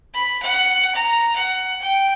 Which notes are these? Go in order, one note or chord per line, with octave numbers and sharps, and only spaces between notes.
B5
F#5
A#5
F#5
G5